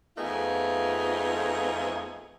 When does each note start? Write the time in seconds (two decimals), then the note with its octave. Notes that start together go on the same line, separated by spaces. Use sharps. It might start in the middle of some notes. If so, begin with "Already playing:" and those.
0.17 F2 A3 B3 D#4 F4 G#4